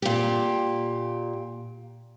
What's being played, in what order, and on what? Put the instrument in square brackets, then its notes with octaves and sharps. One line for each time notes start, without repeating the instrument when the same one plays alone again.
[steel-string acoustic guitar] A#2 G4